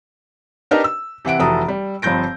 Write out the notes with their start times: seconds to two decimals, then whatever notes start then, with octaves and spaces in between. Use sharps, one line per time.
0.71 D4 D#4 G4 A#4 B4 D#5
0.84 E6
1.25 C3 E3 F#5 D7
1.39 F1 E3 F#4 A4 A#5 D#6
1.68 G3
2.02 G1 F3 C4 G6 A#6 D7